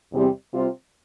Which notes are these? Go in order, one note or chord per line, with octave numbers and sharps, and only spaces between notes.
E2 C3 G3 C4
C3 G3 C4 F4